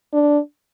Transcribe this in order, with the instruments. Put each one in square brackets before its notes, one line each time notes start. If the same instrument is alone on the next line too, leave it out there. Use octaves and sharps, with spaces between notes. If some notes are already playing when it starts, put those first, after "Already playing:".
[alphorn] D4